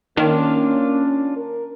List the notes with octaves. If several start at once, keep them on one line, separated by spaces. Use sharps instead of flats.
D#3 A#3 C#4 D4 F4 F5
A#4